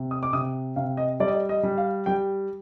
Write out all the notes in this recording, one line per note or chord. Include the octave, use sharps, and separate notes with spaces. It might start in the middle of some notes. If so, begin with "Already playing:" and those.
Already playing: C3
D#6
D6
C3 D#6
C3 F5
D#5
G3 D5
D#5
D5
D#5
G3
F5
G3 G5